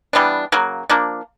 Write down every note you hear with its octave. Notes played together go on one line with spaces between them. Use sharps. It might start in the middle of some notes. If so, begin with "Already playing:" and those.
E3 G3 B3 D4
C#3 F#3 A#3
F3 A#3 D4